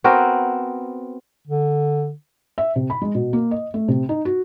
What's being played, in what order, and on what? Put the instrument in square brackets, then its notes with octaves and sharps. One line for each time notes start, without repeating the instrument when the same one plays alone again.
[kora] B3 C4 F#4 A#4
[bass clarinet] D3
[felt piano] E5
C3
B5
G#3
B2
A#3
D#5
A3
C3
D#4
F#4